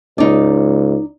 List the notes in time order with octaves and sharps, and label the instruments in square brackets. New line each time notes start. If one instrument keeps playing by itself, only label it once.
[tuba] C#2 [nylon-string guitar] D#4 D5